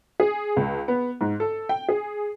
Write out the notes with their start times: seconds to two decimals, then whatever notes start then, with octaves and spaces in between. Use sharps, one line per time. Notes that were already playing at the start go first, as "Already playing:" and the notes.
0.20 G#4
0.56 C#2
0.88 B3
1.21 G#2
1.40 A4
1.69 G5
1.89 G#4